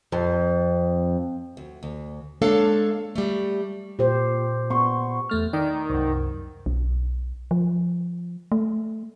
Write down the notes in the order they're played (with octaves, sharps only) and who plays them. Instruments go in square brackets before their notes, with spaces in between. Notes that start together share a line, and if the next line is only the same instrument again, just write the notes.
[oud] F2
[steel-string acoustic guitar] D2
D2
G#3 A#3 D4 A4 C#5 F5
G3 A3
[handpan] A#2 G4 C5
[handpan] B3 [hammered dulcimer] C6 C#6
[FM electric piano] E2 A3 F6
[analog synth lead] D#3 [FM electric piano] D5
[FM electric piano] C2 F#2
[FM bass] B1
F3
A3